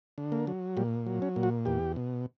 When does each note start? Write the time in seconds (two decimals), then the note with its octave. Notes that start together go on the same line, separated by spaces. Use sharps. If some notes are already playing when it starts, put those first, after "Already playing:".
0.18 D3
0.32 A#3
0.47 F#3
0.77 A#2 G3
1.07 F#3
1.22 C#4
1.36 A#2
1.43 F#4
1.65 E2 G4
1.96 B2